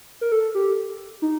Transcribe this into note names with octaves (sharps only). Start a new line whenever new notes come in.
A#4
A4
G4
D#4